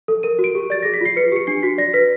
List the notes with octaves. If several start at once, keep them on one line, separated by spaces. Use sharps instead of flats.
A4
A#4 D#7
F#4
D7
G4
D5 A6
G#4 A#6
B6
F4 C7
B4 C#7
G4 C#7
D4 C7
F#4 B6
D5 A#6
B4 B6